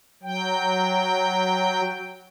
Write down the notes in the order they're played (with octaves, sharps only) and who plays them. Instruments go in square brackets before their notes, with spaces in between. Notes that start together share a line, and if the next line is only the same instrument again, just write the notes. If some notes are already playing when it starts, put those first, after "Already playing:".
[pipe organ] F#3 G5